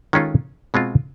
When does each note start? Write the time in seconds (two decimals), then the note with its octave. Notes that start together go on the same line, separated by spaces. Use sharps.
0.13 D#3 G#3 C#4 F4 A4
0.74 B2 G#3 C4 F4